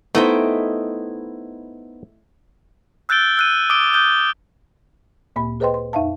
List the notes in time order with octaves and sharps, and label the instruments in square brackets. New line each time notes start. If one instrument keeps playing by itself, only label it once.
[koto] A3 [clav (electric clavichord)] B3 D#4 C5 [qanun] E4 D#5 G5
[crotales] E6 F#6 G6 A6 D7 G7
E6 F#6 D#7
D6 D#6 F#6 D7 G7
D#6 F#6 G6 G7
[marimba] D2 A#2 A#3 B5
G#4 B4 C5 D#5 G5 C6
C6
F2 D#4 E5 F5 A5